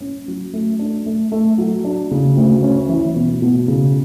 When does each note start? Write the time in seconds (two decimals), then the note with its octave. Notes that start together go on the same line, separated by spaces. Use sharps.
0.01 C#4
0.28 F#3
0.53 A3
0.79 D4
1.06 A3
1.32 A3
1.58 F#3
1.85 D4
2.11 C#3
2.37 D2
2.63 C#4
2.89 E3
3.16 B2
3.42 B2
3.68 C#3